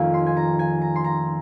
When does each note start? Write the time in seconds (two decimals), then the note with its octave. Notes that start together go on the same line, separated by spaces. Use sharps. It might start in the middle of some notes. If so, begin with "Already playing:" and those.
Already playing: F1 F2 D#3 A#3 C#4 G#5
0.14 C6
0.26 G#5
0.37 A#5
0.59 G#5
0.82 A#5
0.96 C6
1.04 A#5